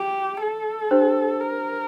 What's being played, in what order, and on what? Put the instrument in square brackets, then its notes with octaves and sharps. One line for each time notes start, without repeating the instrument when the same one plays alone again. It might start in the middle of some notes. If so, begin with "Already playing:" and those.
Already playing: [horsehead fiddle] G4
A4
[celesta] D4 G4 C5
[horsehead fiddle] A#4